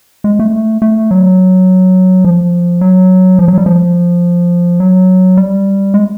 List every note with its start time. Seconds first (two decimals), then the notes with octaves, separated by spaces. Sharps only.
0.24 G#3
0.39 A3
0.82 A3
1.11 F#3
2.25 F3
2.81 F#3
3.39 F3
3.48 F#3
3.58 G3
3.66 F3
4.80 F#3
5.37 G3
5.94 G#3